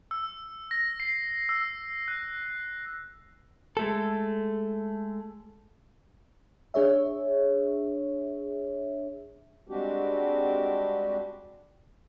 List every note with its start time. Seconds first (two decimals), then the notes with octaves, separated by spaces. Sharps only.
0.11 E6
0.71 A#6
1.00 C7
1.49 E6
2.08 F#6
3.77 G#3 A3 A4
6.74 D4 G#4 C#5 E5
9.68 G3 G#3 C4 D4 F#4 G4